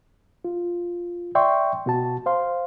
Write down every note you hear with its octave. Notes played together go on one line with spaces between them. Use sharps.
F4
D5 E5 G5 C6 C#6
B2 F#4 A5
C5 F5 C6